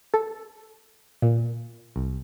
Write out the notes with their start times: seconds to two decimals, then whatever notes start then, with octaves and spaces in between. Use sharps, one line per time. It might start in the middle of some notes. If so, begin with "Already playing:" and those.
0.14 A4
1.22 A#2
1.96 C2